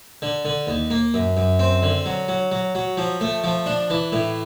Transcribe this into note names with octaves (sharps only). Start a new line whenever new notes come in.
D3
D3
D#2
A#3
F#2
F#2
C4
D3
F#3
F#3
F#3
F#3
F3
A3
F3
D4
E3
A2